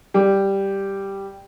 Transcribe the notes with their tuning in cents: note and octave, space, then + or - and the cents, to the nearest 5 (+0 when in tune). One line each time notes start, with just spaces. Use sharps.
G3 +0